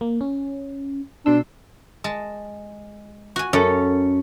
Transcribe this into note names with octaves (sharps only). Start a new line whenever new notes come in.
A#3
C#4
B2 D4 C6 E6
G#3 A5
F#4 G#5
F#2 C#4 A4